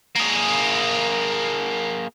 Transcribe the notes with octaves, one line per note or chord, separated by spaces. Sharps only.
A#3 G#4